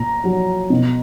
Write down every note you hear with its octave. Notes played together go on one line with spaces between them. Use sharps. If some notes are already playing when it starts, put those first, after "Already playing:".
Already playing: A#2 A#5
F#3
B2